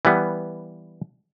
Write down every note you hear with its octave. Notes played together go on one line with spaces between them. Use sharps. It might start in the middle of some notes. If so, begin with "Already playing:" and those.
E3 G3 B3